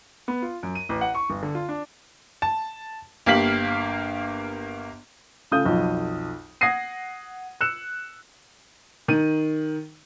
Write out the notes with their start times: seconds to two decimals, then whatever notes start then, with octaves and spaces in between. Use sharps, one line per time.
0.28 B3
0.42 F4
0.63 F#2
0.75 D#7
0.89 A1
1.01 F#5
1.15 C#6
1.30 G1
1.43 D3
1.55 F4
1.69 D4
2.42 A5
3.26 G1 A#3 G4 F5 B6 F#7
5.51 C#3 A3 F4 D#6 G6
5.65 B1 F2
6.61 F#5 D#6 G#6 A#6 C7 D#7
7.61 E6 F#6 C#7 E7
9.08 D#3 D#7